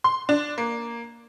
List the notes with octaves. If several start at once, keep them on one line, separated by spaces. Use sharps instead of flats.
C6
D4
A#3